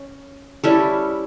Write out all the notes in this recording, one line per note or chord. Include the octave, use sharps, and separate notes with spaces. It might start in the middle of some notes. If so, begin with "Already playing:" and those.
Already playing: C#4
G3 C#4 E4 A4